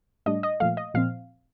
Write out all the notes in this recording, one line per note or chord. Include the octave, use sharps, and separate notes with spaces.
A2 G3 D4 D#5
D#5
A#2 F3 A3 F5
D#5
A#2 F3 C4 F5